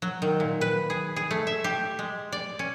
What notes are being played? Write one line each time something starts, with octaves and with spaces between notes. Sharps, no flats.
F#3
D#3
A#2
B4
G#4
G#4
A3
E5
G4
G#3
D5
C#4